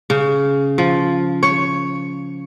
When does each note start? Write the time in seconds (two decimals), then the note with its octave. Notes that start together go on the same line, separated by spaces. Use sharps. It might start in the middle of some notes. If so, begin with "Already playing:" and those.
0.10 C#3
0.78 F3
1.43 C#5